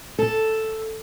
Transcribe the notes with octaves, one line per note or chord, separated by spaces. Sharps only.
A4